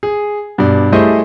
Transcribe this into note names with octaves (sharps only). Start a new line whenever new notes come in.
G#4
G2 B2 D5
G3 A3 E4 G#4 C5 D#5